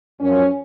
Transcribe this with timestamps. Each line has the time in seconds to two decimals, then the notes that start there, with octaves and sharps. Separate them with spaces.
0.20 F#2 F3 C#4